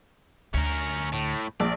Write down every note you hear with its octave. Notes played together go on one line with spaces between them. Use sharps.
D2 C#4 A#4
A2
A#1 D5